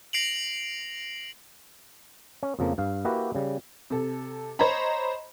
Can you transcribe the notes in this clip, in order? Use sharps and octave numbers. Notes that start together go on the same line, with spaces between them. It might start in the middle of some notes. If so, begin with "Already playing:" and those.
A#6 C7 D7 F7 F#7
C#4
F2 C#3 F3 A#3
G2 F5
A#3 E4 F#4 G4 B4 A#5
C#3 G3
C3 A4
C5 C#5 D#5 A#5 B5